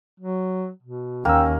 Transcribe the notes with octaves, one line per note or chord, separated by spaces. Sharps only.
F#3
B2
D#2 A#3 C#4 G5 E6